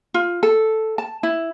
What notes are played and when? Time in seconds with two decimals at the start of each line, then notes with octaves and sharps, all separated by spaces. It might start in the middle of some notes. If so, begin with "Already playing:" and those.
0.14 F4
0.43 A4
0.98 A5
1.23 E4